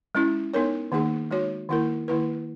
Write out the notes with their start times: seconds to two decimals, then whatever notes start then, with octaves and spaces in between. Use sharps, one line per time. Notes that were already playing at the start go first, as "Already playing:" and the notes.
0.15 G#3 C#4 E4
0.54 B3 D#4 A#4 C#5
0.92 D#3 A#3 D#4 G#4
1.31 G#3 D#4 F#4 C#5
1.69 D#3 A#3 E4 A#4
2.08 D#3 A#3 E4 B4